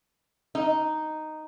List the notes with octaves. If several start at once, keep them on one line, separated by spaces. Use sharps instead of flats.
D#4